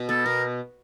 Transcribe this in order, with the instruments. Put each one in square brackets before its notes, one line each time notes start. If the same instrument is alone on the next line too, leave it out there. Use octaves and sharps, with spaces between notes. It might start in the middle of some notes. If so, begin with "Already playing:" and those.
Already playing: [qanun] B2
[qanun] B3 [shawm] A4
[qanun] B2 [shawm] A#4